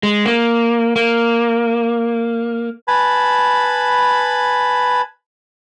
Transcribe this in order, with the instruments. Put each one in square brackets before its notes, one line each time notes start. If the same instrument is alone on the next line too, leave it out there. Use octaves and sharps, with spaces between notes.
[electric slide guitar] G#3
A#3
A#3
[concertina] B4 G#5 A5 B5